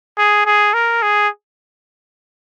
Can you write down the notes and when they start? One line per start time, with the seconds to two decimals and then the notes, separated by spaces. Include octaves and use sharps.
0.18 G#4
0.46 G#4
0.74 A#4
1.03 G#4